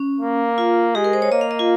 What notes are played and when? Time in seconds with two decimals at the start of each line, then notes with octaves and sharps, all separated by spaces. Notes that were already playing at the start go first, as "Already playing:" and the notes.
Already playing: C#4
0.20 A#3
0.58 F4
0.95 G#3 G4
1.04 A#4
1.13 C5
1.22 C#5
1.32 A#3 D#5
1.41 F5
1.51 D#5
1.59 F4